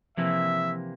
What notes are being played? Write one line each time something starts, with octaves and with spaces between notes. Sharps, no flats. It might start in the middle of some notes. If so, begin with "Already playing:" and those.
C3 E3 F3 A#3 E5